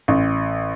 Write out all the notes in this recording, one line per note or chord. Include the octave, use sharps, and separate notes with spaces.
A1